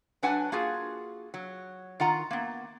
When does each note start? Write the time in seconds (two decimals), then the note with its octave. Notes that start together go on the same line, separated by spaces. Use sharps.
0.23 F#3 D4 B4 F#5 G#5 A5
0.52 A#3 F4 F#4 G#4
1.34 F#3
2.00 D#3 F4 F#5 A#5
2.31 A#3 B3